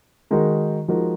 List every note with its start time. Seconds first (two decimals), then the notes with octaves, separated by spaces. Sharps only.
0.31 D#3 G#3 D#4 F#4 A#4
0.88 F3 G#3 D#4 F#4 A#4